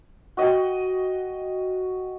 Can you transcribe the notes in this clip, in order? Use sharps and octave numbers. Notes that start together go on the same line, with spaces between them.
F#4 D#5 F#5 G5